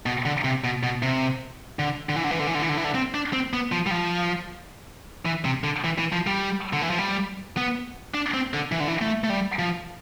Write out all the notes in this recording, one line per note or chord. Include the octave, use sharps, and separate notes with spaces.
B2
D3
C3
B2
B2
C3
D3
D3
E3
D3
E3
D3
E3
D3
E3
D3
E3
D3
C4
D4
C4
B3
F3
G3
F3
E3
C3
D3
E3
E3
F3
G3
D3
E3
F3
G3
B3
D4
C4
D3
E3
D3
E3
A3
A3
G3
F3